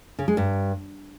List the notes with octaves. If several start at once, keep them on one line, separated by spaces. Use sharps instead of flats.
C#3
G#3
G2